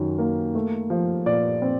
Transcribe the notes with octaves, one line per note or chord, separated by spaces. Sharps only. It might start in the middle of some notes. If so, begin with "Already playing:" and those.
Already playing: F#2 D#3
A#3
A3
F3
A#2 D5
C4